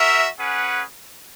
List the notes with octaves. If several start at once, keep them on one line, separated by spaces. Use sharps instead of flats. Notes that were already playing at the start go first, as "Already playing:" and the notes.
Already playing: F#4 A#4 E5
C#4 G#4 B4 F#5